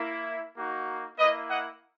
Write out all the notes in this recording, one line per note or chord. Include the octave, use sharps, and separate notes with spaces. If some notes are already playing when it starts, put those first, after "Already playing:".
Already playing: A#3 E4
A#3 D#4 F#4
A#3 E4 B4 D#5
D#5 F#5